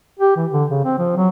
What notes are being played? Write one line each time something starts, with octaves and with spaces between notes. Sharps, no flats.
G4
E3
D3
C#3
C4
F3
F#3